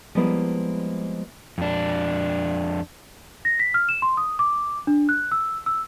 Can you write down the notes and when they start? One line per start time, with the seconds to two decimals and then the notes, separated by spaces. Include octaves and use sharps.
0.15 F3 G3 G#3 A#3 B3 E4
1.58 F2 D4
3.45 A#6
3.60 B6
3.74 F6
3.89 E7
4.02 C6
4.17 D#6
4.39 D6
4.87 D4
5.09 F#6
5.32 E6
5.66 E6